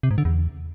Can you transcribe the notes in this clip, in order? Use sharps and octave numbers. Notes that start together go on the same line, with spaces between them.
C3
G#2
D3
E2